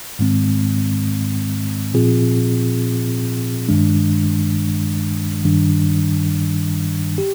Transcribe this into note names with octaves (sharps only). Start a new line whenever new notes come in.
G#2 D#3 G#3 C4
A#2 F3 C4 F4 G#4
G2 D#3 G#3 D4
G2 D#3 G3 D4
G4